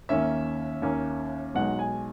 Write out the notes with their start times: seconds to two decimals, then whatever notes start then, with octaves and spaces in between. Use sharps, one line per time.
0.09 D#2 D#3 A#3 C#4 E5
0.82 D#2 D#3 A#3 C#4
1.54 B1 B2 G#3 D#4 F#5
1.79 G#5